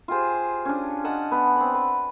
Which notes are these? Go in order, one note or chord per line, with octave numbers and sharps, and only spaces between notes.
F4 G4 G#4 C5
C#4 D4
D#5 F#5 A5 A#5
B3
C4 D5
B4